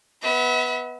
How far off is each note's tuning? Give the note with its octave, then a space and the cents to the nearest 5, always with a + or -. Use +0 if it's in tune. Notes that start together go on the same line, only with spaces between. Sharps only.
B3 +0 E5 -40